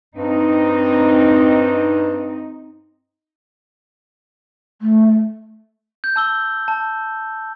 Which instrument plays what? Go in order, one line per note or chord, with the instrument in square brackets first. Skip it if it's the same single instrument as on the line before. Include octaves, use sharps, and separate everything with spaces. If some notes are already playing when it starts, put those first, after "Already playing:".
[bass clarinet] G2 [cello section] C4 D#4
[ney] A3
[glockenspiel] G6
A5 E6 G7
A5